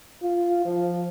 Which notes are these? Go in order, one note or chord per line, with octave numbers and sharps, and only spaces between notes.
F4
F3